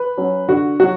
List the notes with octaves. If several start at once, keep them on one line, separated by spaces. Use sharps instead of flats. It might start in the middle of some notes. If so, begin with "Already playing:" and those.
Already playing: B4
F#3 C#4
D3 F#4
F#3 F#4